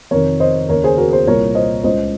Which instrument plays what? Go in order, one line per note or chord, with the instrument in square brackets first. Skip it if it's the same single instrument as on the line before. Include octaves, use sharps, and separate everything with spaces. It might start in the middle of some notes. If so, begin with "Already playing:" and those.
[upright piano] F2 C3 D#3 A#4 C#5
C5 D#5
D#2 C#3 A#4 C#5
G#4 C5
F#4 A#4
G#4 C5
C2 A#2 A#4 C#5
C5 D#5
C#2 C#3 C5 D#5